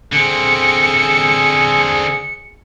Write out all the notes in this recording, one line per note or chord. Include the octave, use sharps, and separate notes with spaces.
D3 C4 G#4 C#7